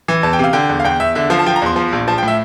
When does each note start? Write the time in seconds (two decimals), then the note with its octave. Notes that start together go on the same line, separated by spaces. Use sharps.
0.08 E3
0.23 E2 A5
0.33 G5
0.39 C3 F5
0.53 D3 G5
0.69 E2
0.80 F5
0.84 E2 G5
1.00 E2 E5
1.15 D3 E5
1.30 F3 F5
1.39 A5
1.46 F3 G5
1.56 A#5
1.62 E2 C6
1.76 F3
1.92 A#1
2.08 F3 A5
2.18 G5
2.23 A2 E5